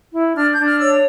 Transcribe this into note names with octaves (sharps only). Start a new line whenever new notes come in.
E4
D4 F6
G6
D4
F6
C#5 E6